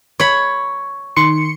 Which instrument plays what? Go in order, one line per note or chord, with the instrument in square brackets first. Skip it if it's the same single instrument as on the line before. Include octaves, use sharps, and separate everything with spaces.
[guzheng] C#5 B5
[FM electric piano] D#3 C6 C#7